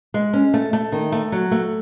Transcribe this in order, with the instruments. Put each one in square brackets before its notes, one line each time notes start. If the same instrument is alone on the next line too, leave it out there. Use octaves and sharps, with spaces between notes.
[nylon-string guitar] G#3
C#4
A3
A3
D#3
A3
F#3
A3